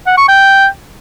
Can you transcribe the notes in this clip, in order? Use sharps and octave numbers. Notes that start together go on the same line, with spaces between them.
F#5
C#6
G5